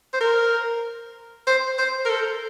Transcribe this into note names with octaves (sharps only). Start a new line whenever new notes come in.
C5
A#4
C5
C5
A#4
A4